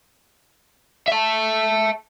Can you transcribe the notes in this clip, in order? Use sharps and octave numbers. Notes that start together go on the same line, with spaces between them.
E5 A5